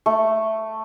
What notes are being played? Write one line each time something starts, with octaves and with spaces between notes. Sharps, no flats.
A3